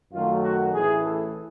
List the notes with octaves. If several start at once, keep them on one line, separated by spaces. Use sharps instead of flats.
F#2 D#3 F#3 A3 F4
F#4
A1 A2 E3 G#4
A4